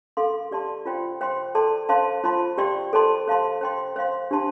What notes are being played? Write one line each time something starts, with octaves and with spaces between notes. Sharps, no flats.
A4 F5 C6
G4 D5 A5 C6
F4 C5 G5 C6
C5 G5 C6
A4 D5 A5 C6
C5 F5 A5 C6
F4 C5 A5 C6
G4 D5 G5 C6
A4 C5 A5 C6
C5 F5 A5 C6
C5 G5 C6
C5 F5 C6
D4 G4 C5 A5 C6